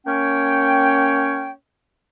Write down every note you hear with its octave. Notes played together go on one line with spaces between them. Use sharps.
A#3 C#4 C#5 G5